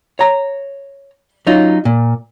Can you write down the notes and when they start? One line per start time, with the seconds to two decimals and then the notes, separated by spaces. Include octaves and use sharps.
0.19 C#5 A#5
1.47 F#3 C#4 D#4 F4
1.85 A#2